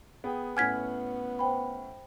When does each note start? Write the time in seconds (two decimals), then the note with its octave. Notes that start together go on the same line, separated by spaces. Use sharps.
0.24 B3 G#4 G5
0.57 A2 B3 C#4 F#5 G#5 F6 G#6 B6
1.39 C5 G5 B5